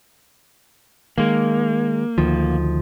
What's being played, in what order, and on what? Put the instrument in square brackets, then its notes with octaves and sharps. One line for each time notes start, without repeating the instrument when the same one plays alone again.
[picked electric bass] D#3 G#3 [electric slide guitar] A#3
[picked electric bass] D2 D#3 F3